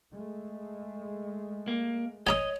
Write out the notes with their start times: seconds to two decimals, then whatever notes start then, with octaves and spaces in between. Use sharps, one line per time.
0.12 G#3 A3
1.68 A#3
2.27 C#5 D#5 G#5 A#5 D#6